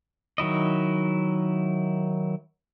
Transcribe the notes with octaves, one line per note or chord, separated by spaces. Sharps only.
D#3 F#3 E4 D#5